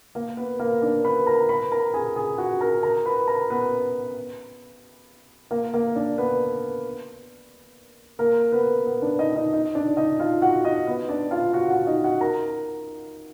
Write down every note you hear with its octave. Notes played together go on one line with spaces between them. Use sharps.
A#3 A#4
B3 B4
A#3 A#4
D4 D5
B4 B5
A#4 A#5
B4 B5
A#4 A#5
G#4 G#5
G#4 G#5
F#4 F#5
A#4 A#5
A#4 A#5
B4 B5
A#4 A#5
B3 B4
A#3 A#4
A#3 A#4
D4 D5
B3 B4
A#3 A#4
B3 B4
B3 B4
D4 D5
D#4 D#5
D#4 D#5
D#4 D#5
D4 D5
D#4 D#5
F4 F5
F#4 F#5
D#4 D#5
B3 B4
D4 D5
F4 F5
F#4 F#5
F#4 F#5
D#4 D#5
F#4 F#5
A#4 A#5